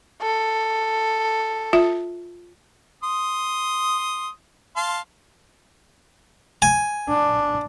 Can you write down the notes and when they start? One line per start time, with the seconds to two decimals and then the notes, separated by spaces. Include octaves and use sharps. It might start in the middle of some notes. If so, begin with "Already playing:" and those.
0.22 A4
1.73 F4 E5
3.03 C6 D#6
4.76 F5 A5 C6
6.62 G#5
7.08 D4